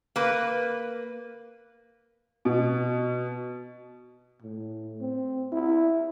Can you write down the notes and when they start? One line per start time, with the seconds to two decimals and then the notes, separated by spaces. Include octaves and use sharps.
0.16 A#3 B4
2.45 B2
4.42 A2
5.01 C4
5.52 E4